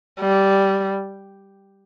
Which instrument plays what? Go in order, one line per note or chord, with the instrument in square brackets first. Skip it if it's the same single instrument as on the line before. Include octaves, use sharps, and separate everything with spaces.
[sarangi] G3